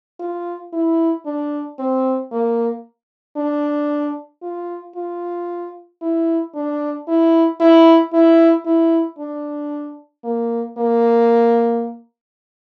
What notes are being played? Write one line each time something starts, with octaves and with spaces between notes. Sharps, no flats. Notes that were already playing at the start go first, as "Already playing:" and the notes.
F4
E4
D4
C4
A#3
D4
F4
F4
E4
D4
E4
E4
E4
E4
D4
A#3
A#3